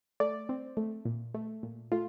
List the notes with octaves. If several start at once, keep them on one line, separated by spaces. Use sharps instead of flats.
A3 D5
C4
A3
A#2
A3
A#2
A3 F4